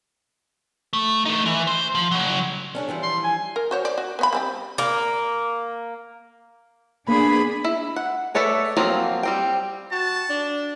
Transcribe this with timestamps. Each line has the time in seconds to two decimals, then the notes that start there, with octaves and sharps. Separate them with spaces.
0.93 A3
1.25 A3 D#4
1.46 E3
1.67 C5
1.95 F3
2.11 C#3 F#3
2.75 C#4 D4 G#4
2.89 E3 F3 G3
3.02 C6
3.24 G#5
3.56 A#4
3.71 F#4 C5 C#5
3.85 D5
3.98 F#4
4.19 B3 C#5 B5
4.33 G3 C4 G4
4.78 A#3
7.08 A#3 B3 D4 G#4 B5
7.65 E4
7.96 F#5
8.35 A3 A4 B4 C#5 D5
8.77 F3 F#3 A#3 C4 F4
9.23 G3 C4 G5
9.92 F#4 A5
10.29 D4